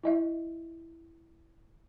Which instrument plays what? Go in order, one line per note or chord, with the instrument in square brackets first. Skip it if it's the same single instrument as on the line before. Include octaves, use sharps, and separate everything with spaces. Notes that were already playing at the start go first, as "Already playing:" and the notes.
[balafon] E4 D#5 E5